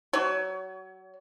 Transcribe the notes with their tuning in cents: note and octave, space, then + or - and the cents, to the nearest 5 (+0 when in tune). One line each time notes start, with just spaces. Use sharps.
F#3 +25 C#5 +30